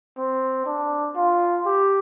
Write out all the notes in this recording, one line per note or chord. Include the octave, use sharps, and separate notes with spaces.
C4
D4
F4
G4